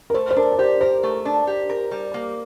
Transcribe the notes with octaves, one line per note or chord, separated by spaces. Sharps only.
A#4
A3 C5
C5
D4 A#4
D5
G4 C5
A#4 C5
A3
D4
G4
A#4
G3
A#3